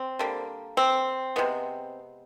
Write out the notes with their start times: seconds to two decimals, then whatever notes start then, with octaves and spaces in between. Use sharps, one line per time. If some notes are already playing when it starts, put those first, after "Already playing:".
Already playing: C4
0.19 D3 G3 A#3
0.77 C4
1.36 C3 E3 G#3 B3